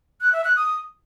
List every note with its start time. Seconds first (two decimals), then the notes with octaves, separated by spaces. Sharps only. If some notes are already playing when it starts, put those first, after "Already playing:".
0.21 F#6
0.33 E5
0.44 F#6
0.56 D#6